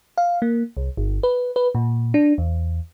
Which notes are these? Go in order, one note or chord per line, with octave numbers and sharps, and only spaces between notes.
F5
A#3
C2
G1
B4
B4
A#2
D4
E2